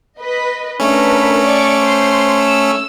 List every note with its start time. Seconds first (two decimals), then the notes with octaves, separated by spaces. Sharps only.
0.19 B4 D#5
0.80 A3 C#4 D4 A#4 B4
1.45 D5 C#6 D6
1.83 C5 C6
2.42 E6